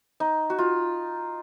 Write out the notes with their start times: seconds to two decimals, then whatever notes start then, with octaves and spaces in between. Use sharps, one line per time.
0.20 D#4
0.50 F#4
0.59 F4